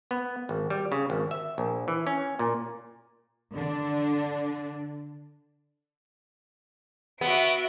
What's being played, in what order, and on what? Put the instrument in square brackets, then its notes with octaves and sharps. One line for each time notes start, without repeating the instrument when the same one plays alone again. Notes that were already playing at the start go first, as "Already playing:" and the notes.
[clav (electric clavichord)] B3
G#1
G3
C#3
G#1
E5
A#1
E3
C#4
A#2
[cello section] D3 D4
[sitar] B3 [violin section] F#4 E5 D7